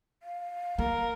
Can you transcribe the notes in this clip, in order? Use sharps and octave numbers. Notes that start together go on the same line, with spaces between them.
F5
A#3 A#4